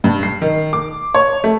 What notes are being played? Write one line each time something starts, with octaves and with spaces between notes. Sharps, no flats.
G2
C7
D#3
D6
C#5
A3